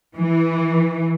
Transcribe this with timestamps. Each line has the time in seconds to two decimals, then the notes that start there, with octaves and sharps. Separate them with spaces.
0.17 E3